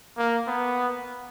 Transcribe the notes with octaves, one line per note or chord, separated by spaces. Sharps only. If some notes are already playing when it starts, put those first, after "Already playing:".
A#3
B3